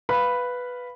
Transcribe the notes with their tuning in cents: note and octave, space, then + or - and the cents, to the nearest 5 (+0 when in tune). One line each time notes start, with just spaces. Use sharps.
B4 +0 F5 +0 B5 +0